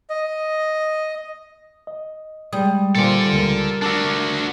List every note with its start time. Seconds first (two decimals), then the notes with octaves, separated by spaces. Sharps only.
0.10 D#5
1.87 D#5
2.53 G3 G#3 D#6
2.95 A#2 A#3 F4 A4 C5 D5 G#5
3.33 C#2 A#4
3.82 D4 F#4 A5 D6 E6